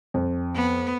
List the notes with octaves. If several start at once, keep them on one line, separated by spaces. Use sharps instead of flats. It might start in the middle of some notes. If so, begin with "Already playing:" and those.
F2
B3